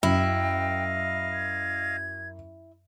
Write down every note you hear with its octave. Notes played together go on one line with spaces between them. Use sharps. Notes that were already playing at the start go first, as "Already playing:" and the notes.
F#2 E4 D#5 F5 G5
G#6